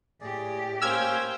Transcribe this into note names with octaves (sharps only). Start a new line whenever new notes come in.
A2 G4 G#4 D5
A#3 C#4 C5 G5 E6 F6 G#6